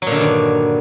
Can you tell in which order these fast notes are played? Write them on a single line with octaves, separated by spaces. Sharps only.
F#3 A#2 D3 D#3 G2